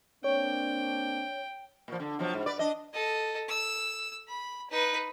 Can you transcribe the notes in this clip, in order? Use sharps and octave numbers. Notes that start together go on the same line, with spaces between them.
A#3 C4 D4 C#5 G5
A#2 F3
D3
B2 F3 F#3
G#2
B4 D5
D4 D#5
A4 D#5
E6
B5
D#4 B4